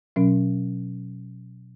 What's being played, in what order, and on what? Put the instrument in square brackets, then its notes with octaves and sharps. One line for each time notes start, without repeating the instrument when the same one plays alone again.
[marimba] B2 F#3 C#4